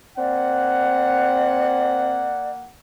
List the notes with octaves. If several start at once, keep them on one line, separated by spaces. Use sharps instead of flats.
A#3 C4 D5 F#5